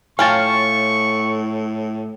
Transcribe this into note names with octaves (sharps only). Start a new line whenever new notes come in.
A2 C#4 F4 F5 G5 A5 C#6